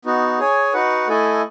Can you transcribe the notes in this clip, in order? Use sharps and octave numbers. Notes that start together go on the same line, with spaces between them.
B3 D#4 F#4
G#4 C#5 G#5
D#4 F#4 B4 F#5
A3 E4 A4 D#5 G#5